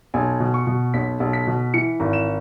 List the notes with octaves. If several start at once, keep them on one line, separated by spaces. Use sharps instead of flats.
B1 G#5
B2
C#6
B2
B1 B6
B1
B6
B2
E3 C#7
G#1
E7